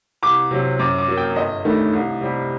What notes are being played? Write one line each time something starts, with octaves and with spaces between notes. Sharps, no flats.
C2 D6
C3 F#3
F#2 D6
D6
F#3 A#3
G5
G1 D#5
G2 D#3 A3
C2
C3 G3